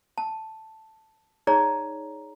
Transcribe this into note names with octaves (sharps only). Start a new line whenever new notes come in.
A5
D#4 G#4 C#5 D5 A#5